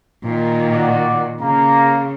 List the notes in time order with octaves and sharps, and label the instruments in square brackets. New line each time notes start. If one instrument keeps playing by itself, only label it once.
[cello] A#2 D#3
[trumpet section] F#4 D5
[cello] C#3 [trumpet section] A#3 A#5